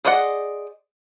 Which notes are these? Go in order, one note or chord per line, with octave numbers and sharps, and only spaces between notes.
G#4 C5 D5 D#5 F#5